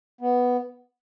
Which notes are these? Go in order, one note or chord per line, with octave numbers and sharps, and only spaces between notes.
B3